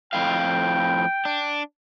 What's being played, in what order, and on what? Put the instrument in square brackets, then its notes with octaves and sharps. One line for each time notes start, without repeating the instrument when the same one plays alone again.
[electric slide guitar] F2 A2 F5 [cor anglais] G5
[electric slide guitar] D4